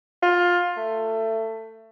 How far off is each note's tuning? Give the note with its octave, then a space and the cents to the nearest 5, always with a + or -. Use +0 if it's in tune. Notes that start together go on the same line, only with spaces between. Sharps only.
F4 +15
A3 +20